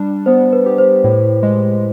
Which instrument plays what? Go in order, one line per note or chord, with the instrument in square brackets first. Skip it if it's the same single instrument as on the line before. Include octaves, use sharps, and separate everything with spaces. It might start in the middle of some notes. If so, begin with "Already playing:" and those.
Already playing: [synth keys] G3 D4
[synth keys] B3 [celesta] C5
[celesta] B4
[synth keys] G4
[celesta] C5
[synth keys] A2
G#3